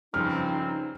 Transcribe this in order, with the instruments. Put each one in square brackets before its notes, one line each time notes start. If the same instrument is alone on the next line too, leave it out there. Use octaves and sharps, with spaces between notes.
[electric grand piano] G2 C#3 F3 [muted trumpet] C4 [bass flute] D#4 [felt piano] F6